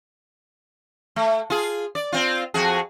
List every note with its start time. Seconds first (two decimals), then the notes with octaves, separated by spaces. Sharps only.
1.16 A3
1.50 F4 G#4
1.95 D5
2.12 C4 F4
2.54 F2 F#4 G#4